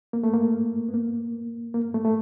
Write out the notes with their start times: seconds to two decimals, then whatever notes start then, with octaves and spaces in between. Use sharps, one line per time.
0.13 A#3
0.23 A3
0.33 A#3
0.89 B3
0.94 A#3
1.74 A#3
1.94 A3
2.05 A3